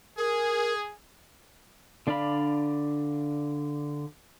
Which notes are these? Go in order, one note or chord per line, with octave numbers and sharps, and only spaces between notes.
G#4 A#4
D3 D4 D5 F5 B5